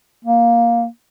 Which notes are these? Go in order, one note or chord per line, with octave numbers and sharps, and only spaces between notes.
A#3